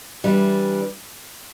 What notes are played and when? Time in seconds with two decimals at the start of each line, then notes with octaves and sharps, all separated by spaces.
0.24 E3 G3 D4